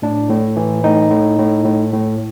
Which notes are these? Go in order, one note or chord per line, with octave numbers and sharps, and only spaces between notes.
A2 D4
A2
E3
A2 D#4
A2
A2
A2
A2